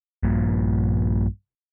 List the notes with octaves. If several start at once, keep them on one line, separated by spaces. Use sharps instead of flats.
A#1 G2 A#2